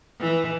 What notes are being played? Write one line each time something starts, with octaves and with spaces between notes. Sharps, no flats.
E3